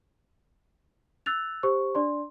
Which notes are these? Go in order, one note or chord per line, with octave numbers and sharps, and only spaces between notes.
E6 F#6 A6 F7
G4 C5 C#6
D4 D5 C6